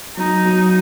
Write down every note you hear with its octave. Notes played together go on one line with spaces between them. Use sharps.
F#3 D#4
F#3